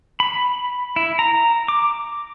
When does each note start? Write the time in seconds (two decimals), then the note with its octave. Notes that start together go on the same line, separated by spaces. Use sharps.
0.20 B5
0.96 E4
1.19 A#5
1.68 D6